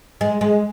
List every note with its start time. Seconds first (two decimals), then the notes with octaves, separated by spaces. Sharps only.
0.21 G#3
0.41 G#3